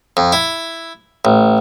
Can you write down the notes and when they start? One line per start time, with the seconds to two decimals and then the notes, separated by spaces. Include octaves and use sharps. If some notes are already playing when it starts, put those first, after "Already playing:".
0.17 F2
0.32 E4
1.25 A1